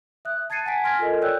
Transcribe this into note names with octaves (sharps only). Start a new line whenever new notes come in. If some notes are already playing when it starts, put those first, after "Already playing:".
E5 D#6 F#6
A5 G#6 A6 C7 C#7 D#7
F#5 G#5 A5 B6 D7
G#5 C6 F6 G#6 A#6 B6
F4 A4 A#4 D#5
C#5 D5 G5 E6 F#6 G6